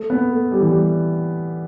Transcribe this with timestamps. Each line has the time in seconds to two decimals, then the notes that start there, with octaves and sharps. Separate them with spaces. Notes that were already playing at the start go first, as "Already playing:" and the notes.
Already playing: A3
0.10 B3
0.31 A3
0.52 G3
0.60 E3
0.69 G3